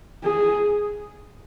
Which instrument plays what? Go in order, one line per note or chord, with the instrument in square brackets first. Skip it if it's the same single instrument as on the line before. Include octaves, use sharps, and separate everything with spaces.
[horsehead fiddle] G#4